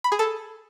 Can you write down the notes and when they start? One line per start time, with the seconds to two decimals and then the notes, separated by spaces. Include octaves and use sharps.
0.04 B5
0.12 G#4
0.19 A4